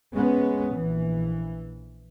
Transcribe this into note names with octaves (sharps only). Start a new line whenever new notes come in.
G#3 B3 C#4
A#1 E3